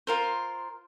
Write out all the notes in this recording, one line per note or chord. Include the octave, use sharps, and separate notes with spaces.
F4 A#4 C5